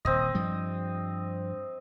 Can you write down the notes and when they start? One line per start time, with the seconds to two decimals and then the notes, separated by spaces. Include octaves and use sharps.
0.05 D#1 G#1 C4 D#5
0.35 G2 F3 G3